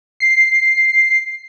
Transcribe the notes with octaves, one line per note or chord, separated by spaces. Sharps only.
C7